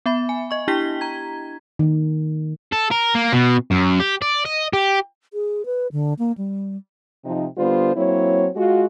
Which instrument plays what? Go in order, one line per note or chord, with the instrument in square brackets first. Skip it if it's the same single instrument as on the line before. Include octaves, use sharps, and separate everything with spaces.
[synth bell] B3 E5 B5
G#5
D#5 C#6
D4 E4 G4 G5 B6 G7
A#5 G#6
[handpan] D#3
[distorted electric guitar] A4
A#4
A#3
B2
F#2
G4
D5
D#5
G4
[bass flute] G#4
B4
D3
A#3
G3
[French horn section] C3 F3 D#4
D3 G3 B3 F4 C5
F#3 A#3 C4 E4 C#5
G#3 F4 F#4